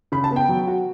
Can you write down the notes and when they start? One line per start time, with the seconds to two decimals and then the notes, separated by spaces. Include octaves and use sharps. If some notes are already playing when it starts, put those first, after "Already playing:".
0.12 C#3 B5
0.24 A5
0.31 B3
0.36 G5
0.49 F#3
0.67 F#4